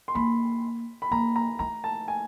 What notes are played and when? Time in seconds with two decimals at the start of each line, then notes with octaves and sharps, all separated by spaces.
0.08 C6
0.15 A#3 B5
1.02 B5
1.11 A#3 A#5
1.36 A#5
1.59 A3 A#5
1.84 A5
2.08 G#5